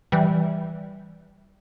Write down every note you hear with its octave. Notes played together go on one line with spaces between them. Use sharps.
E3 G3